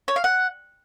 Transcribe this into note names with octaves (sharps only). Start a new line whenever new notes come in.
C#5
F5
F#5